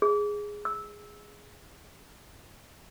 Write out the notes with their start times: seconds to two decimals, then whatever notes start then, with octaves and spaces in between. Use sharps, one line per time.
0.02 G#4
0.65 E6